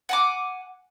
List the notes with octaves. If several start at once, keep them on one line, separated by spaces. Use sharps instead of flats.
F#5 G#5 D6